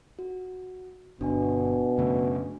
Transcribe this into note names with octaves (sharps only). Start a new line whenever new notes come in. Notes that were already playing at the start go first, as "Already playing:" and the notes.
F#4
G1 B2 D4 G#5
F#2 C#3 A3